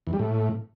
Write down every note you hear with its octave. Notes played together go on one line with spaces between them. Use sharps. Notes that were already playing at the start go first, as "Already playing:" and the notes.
E2
G3
A2